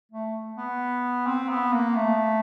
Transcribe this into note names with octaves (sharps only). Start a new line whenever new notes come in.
A3
B3
C4
B3
A#3
A3